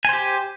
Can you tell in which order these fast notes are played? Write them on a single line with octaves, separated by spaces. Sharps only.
G#5 C5 G4